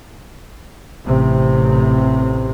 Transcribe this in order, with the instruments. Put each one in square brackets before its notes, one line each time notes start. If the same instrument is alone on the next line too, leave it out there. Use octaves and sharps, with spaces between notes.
[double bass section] A1 C3